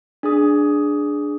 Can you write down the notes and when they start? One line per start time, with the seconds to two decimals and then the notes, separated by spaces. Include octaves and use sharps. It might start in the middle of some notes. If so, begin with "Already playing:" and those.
0.23 D4 G#4 D#6